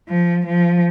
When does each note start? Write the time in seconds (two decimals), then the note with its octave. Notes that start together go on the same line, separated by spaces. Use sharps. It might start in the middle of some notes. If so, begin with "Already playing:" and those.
0.08 F3
0.46 F3